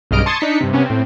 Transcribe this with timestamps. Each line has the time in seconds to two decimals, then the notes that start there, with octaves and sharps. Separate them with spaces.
0.11 B1 G2 C#3 D#5 F6 D7
0.26 A5 C6 C#6 D#6 G#6 A6
0.39 D4 D#4 B6 C#7
0.60 G2 C3
0.73 C3 B3 C#4
0.86 A2 C4